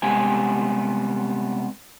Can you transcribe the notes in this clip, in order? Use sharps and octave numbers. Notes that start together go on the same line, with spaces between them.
C3 G3 G#3 B3 G#5